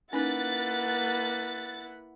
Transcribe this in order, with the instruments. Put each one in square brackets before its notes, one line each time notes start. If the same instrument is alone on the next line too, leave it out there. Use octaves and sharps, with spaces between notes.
[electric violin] A#3 B4 [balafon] C#4 D#4 [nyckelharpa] E4 F#5 [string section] A6